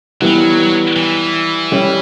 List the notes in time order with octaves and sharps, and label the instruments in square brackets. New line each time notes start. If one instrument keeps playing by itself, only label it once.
[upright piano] E3 G3 B3 [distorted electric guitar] F#3
[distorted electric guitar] E3
[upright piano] G3 C#4 G4